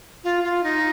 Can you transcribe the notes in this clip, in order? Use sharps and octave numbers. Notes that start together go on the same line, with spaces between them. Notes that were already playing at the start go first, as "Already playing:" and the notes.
F4
F4
D#4